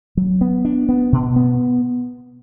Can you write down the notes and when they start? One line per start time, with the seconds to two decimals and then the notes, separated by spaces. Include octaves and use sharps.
0.17 F#3
0.41 B3
0.65 D4
0.89 B3
1.12 B2
1.36 B3